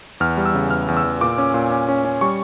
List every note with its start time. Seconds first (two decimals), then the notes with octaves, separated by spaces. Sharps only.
0.20 E2 F6
0.37 G3
0.45 E6
0.54 C#3
0.71 E2 F6
0.88 E2
0.97 E6
1.04 E2
1.21 A#2 D6
1.38 C#4
1.54 A#2
1.72 C#4
1.88 C#4
2.05 C#4
2.21 G3 C#6